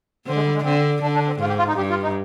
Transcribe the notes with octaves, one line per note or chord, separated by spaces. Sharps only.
D3 C4
G#3
G3
G#3
D3 C4
D3 D4
D4
C4
G#2 F4
G4
F4
D#4
G2 G4
F4
D#4